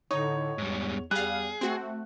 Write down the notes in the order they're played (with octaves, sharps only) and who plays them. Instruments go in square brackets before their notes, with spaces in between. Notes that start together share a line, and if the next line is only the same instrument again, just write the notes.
[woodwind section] A2 D3 [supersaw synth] D#4 [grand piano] C#5
[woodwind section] E2 [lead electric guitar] G#2 G3
[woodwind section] E2 [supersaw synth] G3 F5 [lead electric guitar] G#4 [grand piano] F#6
[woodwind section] A3 [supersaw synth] C4 F#4